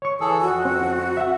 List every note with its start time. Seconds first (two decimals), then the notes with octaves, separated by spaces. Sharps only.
0.02 C#5 C#6
0.20 E3 G#4 A4
0.41 F2 F#4
0.65 C4
1.17 E5 F#5